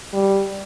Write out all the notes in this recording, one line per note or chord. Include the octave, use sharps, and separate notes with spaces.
G3